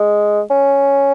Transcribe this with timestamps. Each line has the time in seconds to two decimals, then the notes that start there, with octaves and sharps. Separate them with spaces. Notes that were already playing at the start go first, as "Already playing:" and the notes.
Already playing: G#3
0.50 C#4